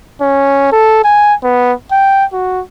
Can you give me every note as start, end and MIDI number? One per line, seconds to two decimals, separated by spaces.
0.21 0.70 61
0.72 1.02 69
1.04 1.34 80
1.44 1.73 59
1.92 2.25 79
2.33 2.61 66